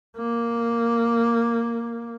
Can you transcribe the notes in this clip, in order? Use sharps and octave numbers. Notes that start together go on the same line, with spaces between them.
A#3